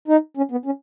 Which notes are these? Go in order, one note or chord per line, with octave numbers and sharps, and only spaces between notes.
D#4
C#4
B3
C#4